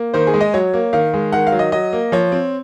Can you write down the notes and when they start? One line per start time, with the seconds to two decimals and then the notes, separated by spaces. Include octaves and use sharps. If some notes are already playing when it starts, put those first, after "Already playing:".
Already playing: A#3
0.14 D#3 C5
0.27 G#4
0.34 G#3
0.41 D#5
0.54 F#3 C#5
0.74 A#3
0.93 D#3 F5
1.14 G#3
1.32 D#3 F#5
1.47 F5
1.52 F#3
1.59 D#5
1.72 F#3 D#5
1.93 A#3
2.12 F3 C#5
2.32 C4